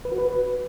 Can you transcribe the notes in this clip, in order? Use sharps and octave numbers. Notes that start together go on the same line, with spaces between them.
B4
F#4
B4